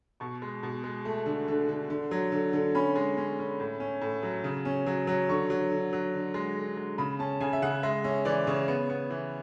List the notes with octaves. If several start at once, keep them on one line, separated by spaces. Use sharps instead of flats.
B2 C#6
G#3
B2
G#3
A3
D3
D3
D3
D3
F#3
D3
D3
C#4 B5
G#3
C#4
C#4
A2
C#4
A2
F#3
C#3
C#4
F#3
F#3
D3 C#6
F#3
D3
F#3
D3
G#3
D3
G#3
C#3 B5
C#4 A5
C#3 G#5
E5
C#3 F#5
G#3 E5
C#4 E5
E3 D5
C#3 C#5
B3
B3
E3